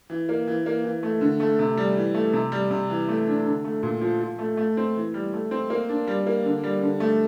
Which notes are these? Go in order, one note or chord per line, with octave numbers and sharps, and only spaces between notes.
E3
A#3
E3
A#3
E3
A3
D3
A3
C3
G3
E3
A3
C3
G3
C3
E3
A3
D4
D3
A3
A#2
F3
F3
A3
A3
C4
E3
G3
A3
C4
A#3
D4
G3
A#3
D3
G3
D3
A3